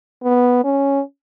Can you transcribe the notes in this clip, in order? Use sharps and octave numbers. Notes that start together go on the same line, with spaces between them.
B3
C#4